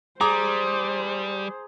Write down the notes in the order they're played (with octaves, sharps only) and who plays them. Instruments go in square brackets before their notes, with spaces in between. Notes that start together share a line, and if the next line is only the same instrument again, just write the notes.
[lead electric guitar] G3 [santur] G#4 [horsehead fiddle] C5 [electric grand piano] A#5 D6